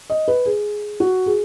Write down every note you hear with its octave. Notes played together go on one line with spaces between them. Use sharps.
D#5
B4
G#4
F#4
G#4